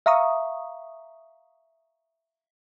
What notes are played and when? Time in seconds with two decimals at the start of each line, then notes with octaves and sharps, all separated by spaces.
0.06 E5 F5 A#5 C#6 D#6